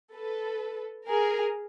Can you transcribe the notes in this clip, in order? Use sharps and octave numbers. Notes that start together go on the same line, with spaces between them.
A4 B4
G#4 A#4